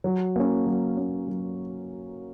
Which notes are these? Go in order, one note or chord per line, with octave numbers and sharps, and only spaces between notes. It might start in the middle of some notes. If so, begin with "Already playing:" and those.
F#3
A#3 C#4
F#3
A#3 C#4
F#3